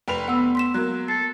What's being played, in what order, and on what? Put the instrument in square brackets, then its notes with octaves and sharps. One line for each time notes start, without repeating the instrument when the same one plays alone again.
[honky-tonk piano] F1 B4 F7 [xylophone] G5
[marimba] B3 [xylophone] F#5 E6
[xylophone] C6 B6 E7
[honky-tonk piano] F#3 A#3 [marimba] F#6
[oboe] A4 [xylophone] C7